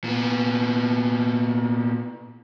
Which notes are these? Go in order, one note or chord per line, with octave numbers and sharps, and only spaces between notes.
A#2 B3